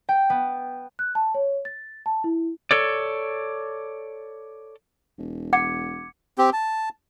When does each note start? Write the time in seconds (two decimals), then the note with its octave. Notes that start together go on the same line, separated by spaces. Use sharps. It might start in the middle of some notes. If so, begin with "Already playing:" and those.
0.09 G5
0.30 B3
0.99 F#6
1.15 A5
1.35 C#5
1.65 A6
2.06 A5
2.24 E4
2.71 A4 C#5 D5
5.18 E1
5.53 F#5 D6 G#6 C#7
6.38 C4 G4
6.53 A5